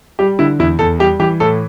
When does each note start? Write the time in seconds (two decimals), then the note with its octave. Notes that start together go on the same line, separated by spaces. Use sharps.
0.19 G3 G4
0.39 D3 E4
0.59 E2 E4
0.79 E2 A4
0.99 G3 G4
1.19 E3 G4
1.40 A2 A4